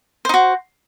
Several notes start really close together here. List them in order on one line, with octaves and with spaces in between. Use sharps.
C5 D#4 F#4